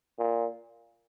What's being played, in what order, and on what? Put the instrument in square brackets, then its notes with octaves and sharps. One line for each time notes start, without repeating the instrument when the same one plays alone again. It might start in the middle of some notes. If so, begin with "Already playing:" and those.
[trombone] A#2